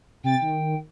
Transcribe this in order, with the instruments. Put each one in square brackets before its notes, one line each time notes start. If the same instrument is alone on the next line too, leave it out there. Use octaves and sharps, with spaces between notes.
[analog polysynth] C3 A6 [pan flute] G5
[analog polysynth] D#3